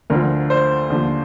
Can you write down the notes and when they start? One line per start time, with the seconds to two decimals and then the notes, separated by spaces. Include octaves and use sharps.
0.10 D2 D3 F3 A#4
0.50 C5
0.90 D#2 D3 F3